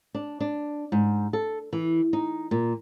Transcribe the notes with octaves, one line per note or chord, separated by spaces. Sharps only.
D4
D4
G#2
A4
E3
D#4
A#2